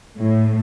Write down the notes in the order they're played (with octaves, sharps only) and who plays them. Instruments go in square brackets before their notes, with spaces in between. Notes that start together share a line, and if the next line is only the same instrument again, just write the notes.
[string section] A2